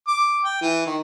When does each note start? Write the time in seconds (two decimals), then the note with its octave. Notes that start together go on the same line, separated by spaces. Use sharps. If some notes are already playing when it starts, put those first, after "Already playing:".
0.08 D6
0.45 G5
0.62 E3
0.87 D#3